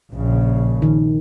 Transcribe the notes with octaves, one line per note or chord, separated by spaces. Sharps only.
A#1 C#3
D#3